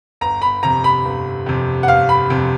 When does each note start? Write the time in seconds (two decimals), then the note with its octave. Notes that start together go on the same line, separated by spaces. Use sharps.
0.21 G1 A#5
0.42 B5
0.63 F2 C3 A#5
0.84 B5
1.05 G1
1.46 F2 C3
1.83 F#5
1.88 G1 F5
2.09 B5
2.30 F2 C3